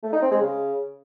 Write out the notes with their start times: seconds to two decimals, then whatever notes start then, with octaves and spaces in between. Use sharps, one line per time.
0.03 A3
0.13 D#4
0.22 C4
0.31 G#3
0.41 C#3